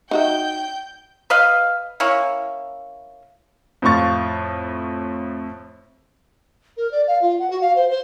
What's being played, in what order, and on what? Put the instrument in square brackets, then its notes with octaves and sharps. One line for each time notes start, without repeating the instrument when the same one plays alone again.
[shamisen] D#4 F#4 E5 [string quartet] G5 G6
[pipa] B4 D#5 F5
A#3 C#4 E4
[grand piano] F2 A2 C5 F5 C#6 A6
[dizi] A#4
D5
F5
F4
F#5
F#4
F5
C5
C5